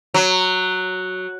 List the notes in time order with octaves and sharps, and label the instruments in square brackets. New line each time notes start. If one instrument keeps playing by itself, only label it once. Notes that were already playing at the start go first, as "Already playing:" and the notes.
[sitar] F#3